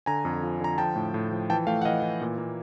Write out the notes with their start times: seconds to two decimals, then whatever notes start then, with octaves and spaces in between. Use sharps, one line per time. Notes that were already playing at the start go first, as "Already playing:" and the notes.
0.06 D3 G#5 A#5
0.25 F2
0.43 F3
0.60 D3 A#5
0.78 F3 G5 A5
0.96 A2
1.14 A2
1.32 F3
1.50 E3 G5 A5
1.67 A3 F5 G5
1.82 F#5
1.85 E3 D#5 F5
2.02 E3
2.21 A#2
2.38 A#3